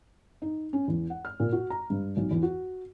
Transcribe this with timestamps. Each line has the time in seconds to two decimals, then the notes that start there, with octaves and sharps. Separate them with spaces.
0.42 D#4
0.73 C#4
0.88 E2
1.10 F#5
1.25 F6
1.40 A#2
1.53 F#4
1.70 A#5
1.90 G2
2.17 B1
2.31 E2
2.43 F#4